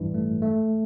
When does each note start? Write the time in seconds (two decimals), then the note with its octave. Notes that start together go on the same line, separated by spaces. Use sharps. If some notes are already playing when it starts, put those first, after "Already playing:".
Already playing: A1 G2 E3
0.14 A3
0.42 A3